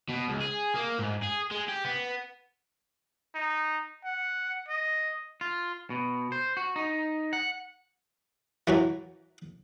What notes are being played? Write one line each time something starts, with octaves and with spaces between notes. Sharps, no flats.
B2
C#2
G#4
A#3
G#2
G#4
G#3
G4
B3
D#4
F#5
D#5
F4
B2
C5
F#4
D#4
F#5
E3 F#3 F#4